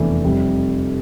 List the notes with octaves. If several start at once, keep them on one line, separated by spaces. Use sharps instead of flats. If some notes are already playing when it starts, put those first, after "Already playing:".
Already playing: F1 E2 E3 A3 D4
F1 F2 C3 G3